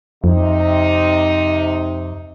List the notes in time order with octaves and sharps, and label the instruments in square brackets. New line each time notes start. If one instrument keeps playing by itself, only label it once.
[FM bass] F2 [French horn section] C3 D#4